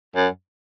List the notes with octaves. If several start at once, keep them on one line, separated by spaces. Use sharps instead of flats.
F#2